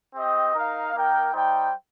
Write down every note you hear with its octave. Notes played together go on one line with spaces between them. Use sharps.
C4 G4 D#5
D#4 A#4 F5
A#3 D#4 A#4 G5
G3 D#4 C5 G5